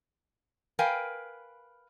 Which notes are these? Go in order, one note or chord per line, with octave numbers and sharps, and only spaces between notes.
A#4 B4 F5 G5 G#5